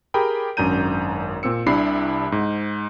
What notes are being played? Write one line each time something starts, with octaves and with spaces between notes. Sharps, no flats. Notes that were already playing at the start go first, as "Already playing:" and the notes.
G4 G#4 A#4 G5 B5 D#6
G#1 F#2 D4 A#5 G6 D#7
A#2 C4 E6 C#7
C2 C3 D4 E4 B5 C7
G#2